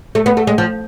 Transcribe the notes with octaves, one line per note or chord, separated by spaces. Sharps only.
A3
B3
A3
G#3
F3